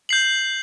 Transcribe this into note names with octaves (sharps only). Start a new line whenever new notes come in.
G6 C7 F#7